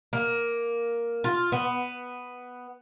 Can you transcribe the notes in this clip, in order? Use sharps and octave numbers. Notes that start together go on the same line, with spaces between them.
A#3
F4
B3